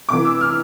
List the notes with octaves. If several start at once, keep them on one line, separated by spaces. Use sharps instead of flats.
C3 E3 D6
E6
F6